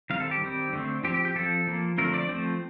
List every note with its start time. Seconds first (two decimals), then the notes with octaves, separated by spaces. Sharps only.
0.10 D#3 G3 C4 F5
0.20 A4
0.31 G4
0.42 D#3 G3 C4
0.73 D3 A3 C4
1.04 F3 C4 G4
1.14 G4
1.25 G4
1.35 F3 C4 A4
1.67 F3 A#3
1.98 D3 F3 A3 C4 A#4
2.14 D5
2.29 F3 A3 C4